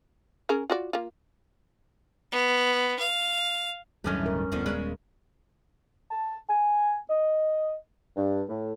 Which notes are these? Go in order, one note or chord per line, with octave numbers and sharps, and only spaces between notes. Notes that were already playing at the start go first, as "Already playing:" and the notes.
C#4 G#4 A#4
F4 F#4 D5
A#3 F4
B3
F5
D1 G2 D#3 E3 F#3 A3 C#4
A#4
D#1 D3 D#3 F3 B3
C#3 G#3 B4
A5
G#5
D#5
G2
A2